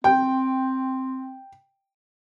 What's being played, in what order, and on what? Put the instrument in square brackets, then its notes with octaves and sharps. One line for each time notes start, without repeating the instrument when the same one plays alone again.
[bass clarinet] C4 [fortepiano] G5